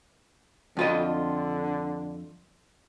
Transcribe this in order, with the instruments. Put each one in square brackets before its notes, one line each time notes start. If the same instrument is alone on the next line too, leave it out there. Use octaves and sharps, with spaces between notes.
[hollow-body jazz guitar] F2 F4 D#5 [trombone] D3